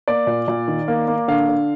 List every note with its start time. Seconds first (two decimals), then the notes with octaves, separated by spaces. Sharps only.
0.08 A#3 D5
0.27 A#2
0.48 A#2
0.68 D#3
0.88 A#3
1.08 A#3
1.28 D3 F5
1.49 D3